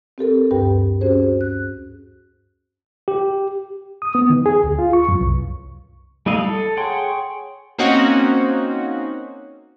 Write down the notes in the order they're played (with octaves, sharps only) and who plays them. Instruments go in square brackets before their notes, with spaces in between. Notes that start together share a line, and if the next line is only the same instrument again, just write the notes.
[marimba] C4 G4 A4 A#4
D2 G2 G4 A#4 B4 G5
C#4 F#4 G#4 C5
F#6
[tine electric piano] G4
[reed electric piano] D#6
B3
D#3
G#4
D2
F4
C#6
F#2
C2
[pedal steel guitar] G3 A3 E4 D#5 F5
A4
G#4 C#5 F#5 G5 C6
[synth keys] A#3 C4 C#4 D#4 F#4